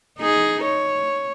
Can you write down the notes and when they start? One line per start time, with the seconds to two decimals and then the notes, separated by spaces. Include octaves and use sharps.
0.18 D#4 G#4
0.64 C#5